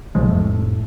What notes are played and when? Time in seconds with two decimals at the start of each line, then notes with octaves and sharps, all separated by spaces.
0.15 B1 F3 G#3
0.29 F1 A2